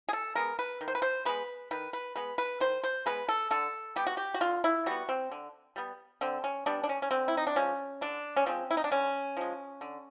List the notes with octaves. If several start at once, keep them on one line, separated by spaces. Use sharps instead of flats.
G#4
A4
G#3 B3 A#4
B4
D#3
C5
B4
C5
G#3 B3 B4
D#3 B4
B4
G#3 B3 B4
B4
D#3 C5
C5
G#3 B3 B4
A4
D3 A4
G3 B3 G4
F#4
G4
F#4
D3 F4
E4
G3 B3 F#4
C4
D3
G3 B3
D3 C4
C#4
G3 B3 D4
D4
C#4
C#4
D3 C4
E4
D#4
D4
F3 G#3 C#4
D3 D4
C#4
F3 G#3 C4
E4
D#4
D4
D3 C#4
F3 G#3
D3